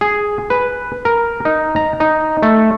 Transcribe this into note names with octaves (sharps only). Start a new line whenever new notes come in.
G#4
B4
A#4
D#4
A#5
D#4
A3